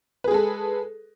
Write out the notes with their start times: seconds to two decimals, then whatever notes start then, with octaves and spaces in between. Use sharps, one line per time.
0.24 B4
0.28 G#4
0.31 G#3
0.34 A4